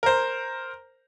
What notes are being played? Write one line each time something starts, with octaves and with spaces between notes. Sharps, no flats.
A#4 C5